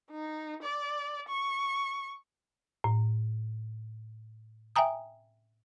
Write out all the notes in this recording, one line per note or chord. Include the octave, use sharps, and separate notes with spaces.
D#4
D5
C#6
A2
E5 G5 G#5 A#5 D#6